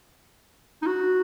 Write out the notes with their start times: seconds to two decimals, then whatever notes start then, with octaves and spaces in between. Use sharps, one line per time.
0.82 D#4
0.86 F#4